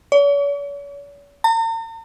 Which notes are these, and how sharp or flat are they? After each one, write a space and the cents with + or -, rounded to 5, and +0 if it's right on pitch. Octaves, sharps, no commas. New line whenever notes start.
C#5 +45
A#5 -45